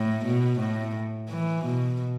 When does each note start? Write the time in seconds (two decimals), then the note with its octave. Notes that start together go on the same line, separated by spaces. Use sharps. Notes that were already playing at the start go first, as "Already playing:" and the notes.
Already playing: A2
0.25 B2
0.59 A2
1.30 E3
1.65 B2